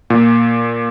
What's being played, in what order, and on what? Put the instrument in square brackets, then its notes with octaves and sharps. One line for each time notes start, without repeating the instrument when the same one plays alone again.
[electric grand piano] A#2